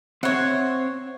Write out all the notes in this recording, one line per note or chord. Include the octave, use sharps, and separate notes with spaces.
C4 C5 C#5 E5 F#5